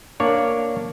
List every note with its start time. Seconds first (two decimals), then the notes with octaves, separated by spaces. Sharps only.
0.20 A#3 D4 C#5 D5